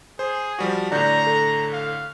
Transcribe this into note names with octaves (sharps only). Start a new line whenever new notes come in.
G#4 C5
F3 G3 F#4
A2 D3 D5 A#5 G6
A4
F5